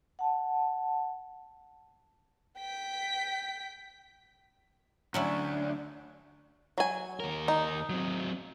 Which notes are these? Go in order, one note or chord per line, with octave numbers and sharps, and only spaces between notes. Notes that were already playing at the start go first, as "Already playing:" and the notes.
F#5 A5
G5 B6
D2 F#3 C#4 D4 E4
F#3 G#5
D#2 A#4
D#4
F#3 C4